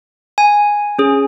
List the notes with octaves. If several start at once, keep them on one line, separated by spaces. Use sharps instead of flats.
G#5
C#4 G#4